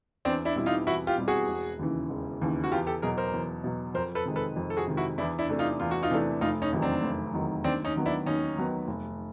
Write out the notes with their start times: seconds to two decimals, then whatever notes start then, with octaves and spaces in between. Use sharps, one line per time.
0.25 E2 C4 D4
0.45 D4 E4
0.56 B2 G3 C4 E4
0.66 D#4 F4
0.87 E2 E4 F#4
1.07 F4 G4
1.17 B2 G3 C4 E4
1.28 F#4 G#4
1.48 E1
1.79 D#2 C#3 E3
2.10 E1
2.41 D#2 C#3 E3
2.64 F#4
2.72 E2 F4 G4
2.87 G4 A4
3.02 B2 F#3 G#4 A#4
3.18 A#4 C5
3.33 E2
3.64 B2 F#3
3.94 F2 A#4 C5
4.15 A4 B4
4.25 C3 D#3 G#3
4.36 A4 B4
4.56 F2
4.70 A4
4.77 F#4 G#4
4.87 C3 D#3 G#3
4.97 E4 F#4
5.18 E2 D4 E4
5.39 D4 E4
5.49 C3 E3 A3 D4
5.59 D#4 F4
5.80 E2 F4
5.91 F#4
6.03 D#4 F4
6.10 C3 E3 A3 D4
6.41 F1 D#4 F4
6.62 C#4 D#4
6.72 E2 C3 D#3 F#3
6.82 C4 D4
7.03 F1
7.33 E2 C3 D#3 F#3
7.64 D#2 C4 D4
7.85 C#4 D#4
7.96 D#3 F#3 B3
8.06 D4 E4
8.26 D#2 C#4 D#4
8.56 D#3 F#3 B3
8.87 F1